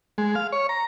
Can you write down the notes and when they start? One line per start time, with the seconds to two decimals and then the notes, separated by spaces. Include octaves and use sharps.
0.18 G#3
0.35 F5
0.52 C#5
0.69 A#5